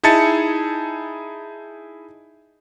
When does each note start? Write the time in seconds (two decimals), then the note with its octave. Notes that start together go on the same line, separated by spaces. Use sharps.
0.03 D#4 E4 G#4 A5 A6 C#7